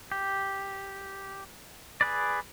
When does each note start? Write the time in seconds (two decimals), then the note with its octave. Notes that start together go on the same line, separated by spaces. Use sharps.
0.12 G4
2.01 G#4 B4 D5